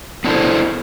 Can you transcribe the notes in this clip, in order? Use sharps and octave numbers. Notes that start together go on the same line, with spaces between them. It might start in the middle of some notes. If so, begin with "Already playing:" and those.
B3 D4 E4 A4 C5